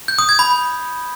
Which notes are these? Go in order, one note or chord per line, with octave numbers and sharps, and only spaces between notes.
G6
D#6
G#6
B5